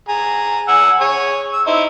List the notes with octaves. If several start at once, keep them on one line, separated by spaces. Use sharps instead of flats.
G#4 A#5
F#5 G#5 E6
G#4 C#5 G#5
E6
D#4 E4 C5